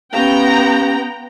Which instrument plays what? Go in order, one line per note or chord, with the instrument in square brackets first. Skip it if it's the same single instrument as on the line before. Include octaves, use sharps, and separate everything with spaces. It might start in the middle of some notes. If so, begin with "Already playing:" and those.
[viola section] B3 G5 A#5 [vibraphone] C#4 G4 F5